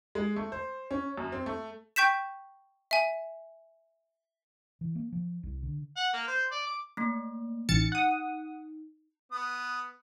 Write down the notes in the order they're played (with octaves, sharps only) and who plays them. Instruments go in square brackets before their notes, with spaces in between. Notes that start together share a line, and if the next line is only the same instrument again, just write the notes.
[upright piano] G#3
A3
C5
C#4
F#2
C4
A3
[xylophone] G5 C#6 G6 B6 E7
E5 G#5
[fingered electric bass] E3
A#3
F3
C2
D3
[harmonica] F#5
A#3
C5
D5
D6
[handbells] A3 A#3
[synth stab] A1 A6 C#7 [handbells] D#4
[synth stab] F#5 D#6
[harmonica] B3 D#6